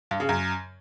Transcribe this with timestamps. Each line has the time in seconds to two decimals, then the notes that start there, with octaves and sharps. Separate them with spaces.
0.11 G2
0.20 C#3
0.29 F#2